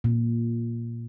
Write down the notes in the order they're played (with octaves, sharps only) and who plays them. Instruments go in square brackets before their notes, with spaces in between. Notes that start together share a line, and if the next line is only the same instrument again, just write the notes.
[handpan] A#2